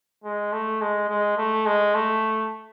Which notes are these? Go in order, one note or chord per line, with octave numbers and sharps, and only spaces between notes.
G#3
A3
G#3
G#3
A3
G#3
A3